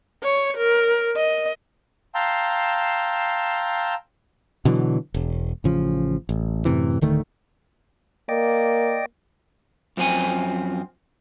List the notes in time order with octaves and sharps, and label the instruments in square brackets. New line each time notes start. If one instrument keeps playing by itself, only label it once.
[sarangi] C#5
A#4
D#5
[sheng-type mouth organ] F5 G5 A5 A#5 C6 E6
[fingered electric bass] B2 D3 E3 F#3
E1
A1 C#3 F3
A1
F#2 A2 C3 E3
D1 D3 D#3 A3
[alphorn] A#3 [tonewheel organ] D5 D#5 G5
[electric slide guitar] F#2 F3 C4 D4 G#5